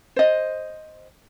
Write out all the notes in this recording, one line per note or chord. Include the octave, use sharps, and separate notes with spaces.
C5 D#5